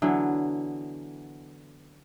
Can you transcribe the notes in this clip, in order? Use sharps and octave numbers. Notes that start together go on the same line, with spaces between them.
D3 E3 F#3 B3